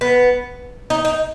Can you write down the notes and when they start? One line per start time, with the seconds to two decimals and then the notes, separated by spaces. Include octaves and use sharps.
0.01 B3
0.90 D#4
1.05 D#4